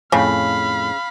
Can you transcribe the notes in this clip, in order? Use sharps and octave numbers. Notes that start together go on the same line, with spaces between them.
F2 A2 C#3 F5 G5 B5